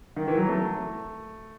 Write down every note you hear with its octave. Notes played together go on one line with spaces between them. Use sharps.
D#3
E3
F#3
A3